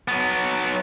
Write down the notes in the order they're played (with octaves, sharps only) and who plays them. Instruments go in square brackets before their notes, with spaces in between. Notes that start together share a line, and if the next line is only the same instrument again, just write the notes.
[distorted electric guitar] F#3 B3